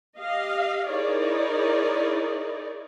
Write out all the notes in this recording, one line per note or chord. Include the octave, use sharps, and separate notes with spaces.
G4 D#5 F5
D#4 E4 G#4 A#4 C#5 D5